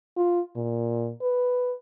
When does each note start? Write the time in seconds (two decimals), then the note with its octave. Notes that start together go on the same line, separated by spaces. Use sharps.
0.16 F4
0.56 A#2
1.22 B4